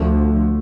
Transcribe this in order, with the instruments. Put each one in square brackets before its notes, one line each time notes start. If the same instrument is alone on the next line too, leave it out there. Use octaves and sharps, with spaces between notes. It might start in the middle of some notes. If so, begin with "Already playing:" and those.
Already playing: [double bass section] D2 D3 F3 [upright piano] A3